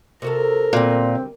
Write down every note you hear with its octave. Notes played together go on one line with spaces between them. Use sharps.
C3 F#4 A4 A#4
D2 A#2 G3 C4